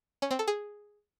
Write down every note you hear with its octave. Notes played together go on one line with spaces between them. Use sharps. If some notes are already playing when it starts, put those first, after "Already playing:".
C#4
C4
A4
G#4